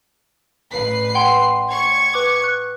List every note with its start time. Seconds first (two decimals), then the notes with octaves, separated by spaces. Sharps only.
0.72 A1 B4 C7
1.15 F#5 G5 C6
1.69 C#6 G#6
2.14 B4 D6
2.44 F#6